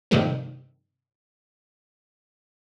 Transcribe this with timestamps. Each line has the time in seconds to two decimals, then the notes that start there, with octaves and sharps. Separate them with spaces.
0.11 G2 C3 D#3 F3 G3 A3